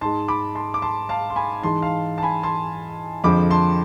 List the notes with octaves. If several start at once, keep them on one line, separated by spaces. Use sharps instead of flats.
G#2 G#3 A5 C6
B5 D6
A5 C6
D6
A5 C6
F5 A5
C6
G#5 B5
G#2 E3 G#3 A5 C6
F5 A5
A5
G#5 B5
A5 C6
F2 D3 F3 G#3 B5 D6
A5 C6